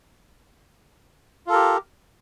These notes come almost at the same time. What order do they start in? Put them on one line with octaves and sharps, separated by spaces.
F4 A4 A#4 G4